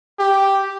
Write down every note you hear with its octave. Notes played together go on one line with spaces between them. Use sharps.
G4